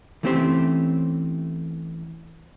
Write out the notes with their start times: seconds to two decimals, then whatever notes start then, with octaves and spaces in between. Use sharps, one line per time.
0.23 E3 A3 C4 C#4 G4 C5